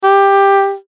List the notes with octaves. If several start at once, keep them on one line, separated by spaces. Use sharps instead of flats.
G4